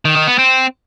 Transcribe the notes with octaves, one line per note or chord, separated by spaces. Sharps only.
D#3
D#3
B3
C4